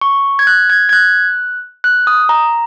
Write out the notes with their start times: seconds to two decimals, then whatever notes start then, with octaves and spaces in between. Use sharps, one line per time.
0.01 C#6
0.39 G#6
0.47 F#6
0.70 G#6
0.89 G#6
0.93 F#6
1.84 F#6
2.07 D#6
2.29 A#5